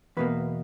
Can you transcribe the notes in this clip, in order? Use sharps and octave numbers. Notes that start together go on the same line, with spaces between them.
E2 B2 A#3 B4